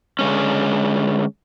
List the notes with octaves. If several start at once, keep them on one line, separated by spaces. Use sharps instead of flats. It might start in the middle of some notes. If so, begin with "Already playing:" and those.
D3 G#3 C#4